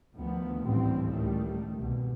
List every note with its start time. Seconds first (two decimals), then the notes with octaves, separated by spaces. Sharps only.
0.15 D2 D#3 F3 A3 B3
0.65 A1 D2 G#2 C#3 G3 C4
1.07 C#2 A2 D#3 G3 A3
1.79 C2 G#2 B2